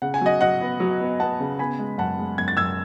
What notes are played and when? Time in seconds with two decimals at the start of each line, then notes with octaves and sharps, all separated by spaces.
0.02 C#3 F#5
0.14 G#5
0.21 F#3 D#5 F#5
0.41 F#3 D#5 F#5
0.61 B3
0.80 F#3
1.00 B3
1.20 B3 F#5 A5
1.40 C#3
1.59 B3 G#5 B5
1.79 G#3
1.98 F#2 F#5 A5
2.18 G#3
2.38 F#2 G#6
2.48 A6
2.57 F#2 E6 G#6